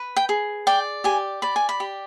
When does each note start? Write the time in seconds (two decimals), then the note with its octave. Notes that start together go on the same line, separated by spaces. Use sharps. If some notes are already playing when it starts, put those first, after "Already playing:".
Already playing: B4
0.16 G5
0.29 G#4
0.67 D5 G5
1.04 G4 G#5
1.42 D5 B5
1.56 G#5
1.69 B5
1.80 G4